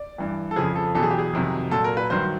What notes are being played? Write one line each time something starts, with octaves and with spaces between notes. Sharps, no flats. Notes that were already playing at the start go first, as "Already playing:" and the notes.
Already playing: D5
G2 E3
A4
F2 C#3 F3 G#4
A4
E2 B2 F#3 A4
G#4
G4
G#4
F2 C3 D#3 F#3
A#2 F#3 A4
A#4
B4
G2 D#3 F#3 C5